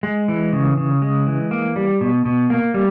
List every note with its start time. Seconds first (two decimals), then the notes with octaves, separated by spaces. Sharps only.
0.03 G#3
0.28 E3
0.53 C#3
0.77 C#3
1.02 G#3
1.27 E3
1.51 A#3
1.76 G3
2.01 B2
2.25 B2
2.50 A#3
2.74 G3